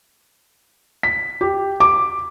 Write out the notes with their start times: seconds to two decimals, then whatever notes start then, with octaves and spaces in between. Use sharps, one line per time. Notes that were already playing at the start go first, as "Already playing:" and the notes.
1.03 B6
1.41 G4
1.80 D6